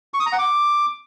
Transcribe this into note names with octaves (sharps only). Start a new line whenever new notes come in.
C#6
D#6
A#5
F#5
D6